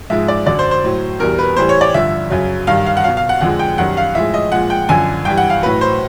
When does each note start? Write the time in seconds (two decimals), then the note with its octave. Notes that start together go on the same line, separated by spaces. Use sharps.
0.10 G#2 F3 G#3 E5
0.28 D5
0.46 F#2 D3 F#3 D5
0.59 C5
0.71 C5
0.84 A2 F#3
1.19 E2 B2 G3 A#4
1.39 B4
1.56 A2 E3 G3 C5
1.69 C#5
1.81 D5
1.94 G2 D3 F3 E5
2.30 F#2 C#3 F#3
2.67 G2 D#3 G3 F5
2.86 F5
2.97 F#5
3.04 B2 F#3 F5
3.17 F5
3.29 F#5
3.41 F2 D3 F3 G#3 F#5
3.59 G5
3.78 F#2 D#3 G3 F#5
3.97 F5
4.15 A2 F3 G#3 E5
4.34 D#5
4.52 A#2 F3 G#3 F#5
4.70 G5
4.89 F#2 D3 F3 G#5
5.25 G2 E3 G3 G5
5.37 F#5
5.50 F5
5.62 A2 F#3 B4
5.81 C5